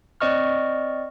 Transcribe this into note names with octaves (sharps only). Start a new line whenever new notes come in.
C4 D5 D#5 C#6 F6